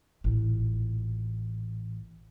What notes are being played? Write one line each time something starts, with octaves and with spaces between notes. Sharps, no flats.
A1 A#2